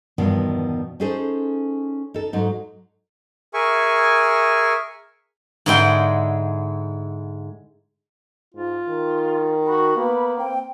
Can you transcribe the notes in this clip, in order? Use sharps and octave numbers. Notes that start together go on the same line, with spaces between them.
E2 G2 B2 D#3 F3
C#4 D#4 G#4 A4 C5
D#4 A4
G#2 F#3 D#4
G#4 A#4 E5 G#5 C#6
G#2 D3 G#3 E4 G5
G#2 F4
D#3
F#4 B5
A#3 B3
C4 G5